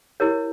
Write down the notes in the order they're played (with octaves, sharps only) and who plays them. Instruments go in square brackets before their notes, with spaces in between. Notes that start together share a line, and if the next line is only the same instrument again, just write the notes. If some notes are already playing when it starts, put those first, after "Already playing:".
[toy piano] E4 G4 A#4 C#5